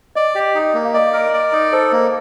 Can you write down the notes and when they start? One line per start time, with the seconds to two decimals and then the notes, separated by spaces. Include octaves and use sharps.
0.16 D5 D#5
0.35 G4
0.55 D#4
0.74 A#3
0.85 F5
0.94 D5 D#5
1.13 A#4
1.33 D5
1.53 D#4
1.73 A4 C5
1.92 A#3